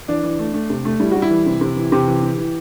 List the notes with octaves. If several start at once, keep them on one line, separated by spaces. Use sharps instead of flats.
E3 D4
E3
A3
A3
C3
A3
G3 E4
G3 F#4
E4
E3
C3
C3
E3
C3 G4
E3
E3
E3